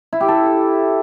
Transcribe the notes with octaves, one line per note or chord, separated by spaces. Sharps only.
E4
G4
A4